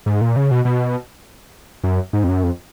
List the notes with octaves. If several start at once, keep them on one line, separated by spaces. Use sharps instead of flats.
G#2
A#2
C#3
B2
B2
F#2
G#2
F2
F#2
F2